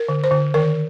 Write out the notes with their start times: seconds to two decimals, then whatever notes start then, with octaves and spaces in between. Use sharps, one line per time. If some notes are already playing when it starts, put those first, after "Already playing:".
Already playing: A#4
0.09 D3
0.24 C5
0.31 D3
0.54 D#3 A#4